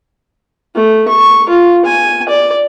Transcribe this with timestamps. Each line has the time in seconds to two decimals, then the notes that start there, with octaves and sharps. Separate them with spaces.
0.76 A3
1.08 C#6
1.49 F4
1.85 G#5
2.29 D5